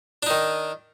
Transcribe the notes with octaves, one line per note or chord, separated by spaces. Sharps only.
D#3 D4 D#4